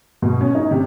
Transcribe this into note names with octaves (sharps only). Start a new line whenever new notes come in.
B2
C#4
D#4
C3